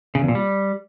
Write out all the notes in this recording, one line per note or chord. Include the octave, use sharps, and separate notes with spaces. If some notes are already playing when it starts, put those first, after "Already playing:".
C#3
E2
A#2
G3